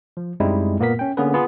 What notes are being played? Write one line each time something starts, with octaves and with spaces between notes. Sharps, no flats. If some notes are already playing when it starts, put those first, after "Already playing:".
F3
F#2 G3 G#3 C4 D#4 E4
A#2 A#3 B3 A#4 B6
C#4 G5
D3 A#3 B3 C#4 G#4 B4
B3 F4 G#4